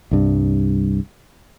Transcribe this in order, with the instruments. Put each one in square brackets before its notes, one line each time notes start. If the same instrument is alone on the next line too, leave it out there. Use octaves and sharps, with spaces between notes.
[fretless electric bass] C2 G2